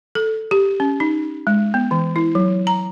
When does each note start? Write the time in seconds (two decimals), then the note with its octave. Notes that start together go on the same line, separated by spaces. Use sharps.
0.15 A4
0.51 G4
0.80 C#4
1.00 D#4
1.47 G#3
1.74 B3
1.91 E3
2.16 E4
2.35 F#3
2.67 A#5